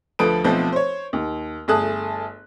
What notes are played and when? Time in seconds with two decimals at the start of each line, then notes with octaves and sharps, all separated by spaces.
0.19 D2 F3 A4 B4 D#6 D7
0.44 B1 F3 A3 B3 C4 A4
0.72 C5 C#5
1.13 D#2
1.68 G1 A3 G#4 A5 D#6 F#6